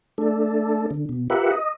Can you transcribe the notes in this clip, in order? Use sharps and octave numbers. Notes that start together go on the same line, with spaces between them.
A3 D4 A4
D3
B2
F4 G4 A#4 B4 E5 F#5
D#5